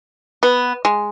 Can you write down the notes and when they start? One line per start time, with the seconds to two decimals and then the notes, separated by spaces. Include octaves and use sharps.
0.43 B3
0.85 G#3